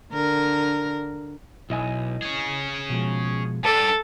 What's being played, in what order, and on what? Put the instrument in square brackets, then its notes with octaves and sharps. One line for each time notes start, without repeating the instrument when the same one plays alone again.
[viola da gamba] D3 A#4
[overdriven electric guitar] B1 [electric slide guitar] E4 D#5 G#5
[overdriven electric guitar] C#4 G#4
[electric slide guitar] B2 F3 G#3
[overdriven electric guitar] G3 D4 [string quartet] A4